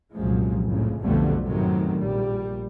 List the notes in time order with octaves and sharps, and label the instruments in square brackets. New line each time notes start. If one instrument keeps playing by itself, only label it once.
[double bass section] C2 F#2 A#2 F3 G#3
A1 F2 A2 C#3
B1 F2 B2 D3 G3 A3
F#2 A2 C3 D#3 F#3
A#1 G3